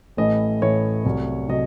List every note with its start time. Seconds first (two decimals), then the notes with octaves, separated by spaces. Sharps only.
0.17 A1 A2 E3 A3 D#5
0.62 A1 A2 E3 A3 C#5
1.05 C2 C3 F#3 A3
1.48 C3 F#3 A3 D#5